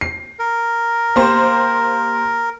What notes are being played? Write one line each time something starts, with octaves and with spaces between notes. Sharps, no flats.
C7
A#4
A#3 G4 C5